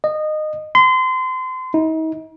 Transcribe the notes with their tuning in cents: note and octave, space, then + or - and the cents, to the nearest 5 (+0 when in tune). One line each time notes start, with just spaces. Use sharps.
D#5 -20
C6 -30
D#4 +40